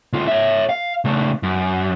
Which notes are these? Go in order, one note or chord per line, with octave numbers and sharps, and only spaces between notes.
D2 F4
C#5 E5
F5
C#3 A3
F#2